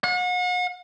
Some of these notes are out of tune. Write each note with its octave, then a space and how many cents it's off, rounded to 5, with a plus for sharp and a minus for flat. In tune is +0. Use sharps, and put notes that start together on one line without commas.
F#5 -40